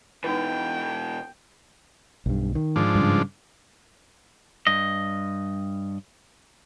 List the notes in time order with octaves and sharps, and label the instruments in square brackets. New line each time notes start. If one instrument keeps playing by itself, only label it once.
[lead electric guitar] B2 E3 [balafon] D#4 B4 [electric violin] G5
[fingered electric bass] B1 G2
D#3
[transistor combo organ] G#2 F3 D4
[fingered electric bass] G2 C#3
[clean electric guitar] G2 D#5